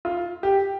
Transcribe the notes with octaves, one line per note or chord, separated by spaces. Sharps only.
F4
G4